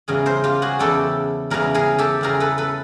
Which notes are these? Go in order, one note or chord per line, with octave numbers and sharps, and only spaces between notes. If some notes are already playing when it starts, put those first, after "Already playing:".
E2 C#3 E3 G3 G#4 A#4
A#4 C5
F4 G4
F#4 G#4
E2 C#3 E3 G3 G4 A4
E2 C#3 E3 G3 G#4 A#4
G#4 A#4
G4 A4
E2 C#3 E3 G3 G#4 A#4
A4 B4
A4 B4